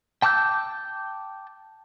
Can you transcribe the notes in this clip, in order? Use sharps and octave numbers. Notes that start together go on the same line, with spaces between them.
G5 A5 D6 E6 G6